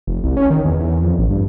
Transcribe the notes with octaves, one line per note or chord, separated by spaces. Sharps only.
F1
C2
C#4
D#3
E2
E2
F2
A1
G2